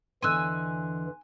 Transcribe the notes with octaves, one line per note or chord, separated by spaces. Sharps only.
E2 D3 E3 D#5 G#5 C6 E6 F#6